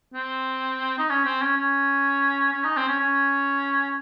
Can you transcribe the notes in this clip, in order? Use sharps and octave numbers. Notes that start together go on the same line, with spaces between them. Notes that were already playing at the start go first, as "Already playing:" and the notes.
C4
D#4
C#4
C4
C#4
C#4
C#4
D#4
C4
C#4
C#4